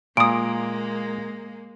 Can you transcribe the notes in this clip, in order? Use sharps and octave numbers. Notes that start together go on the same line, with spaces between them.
A#2 G#3 A#3 D#6 D7